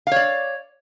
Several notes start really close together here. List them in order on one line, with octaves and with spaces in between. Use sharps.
F5 C#5 D5